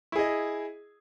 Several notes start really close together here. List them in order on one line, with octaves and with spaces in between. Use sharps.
E4 G#4 D#5